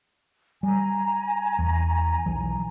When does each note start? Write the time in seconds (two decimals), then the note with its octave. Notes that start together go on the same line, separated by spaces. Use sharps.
0.63 G3 G#5 A#5
1.59 E2
2.26 B1 E3 F#3